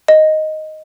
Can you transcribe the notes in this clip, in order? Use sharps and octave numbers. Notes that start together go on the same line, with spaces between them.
D#5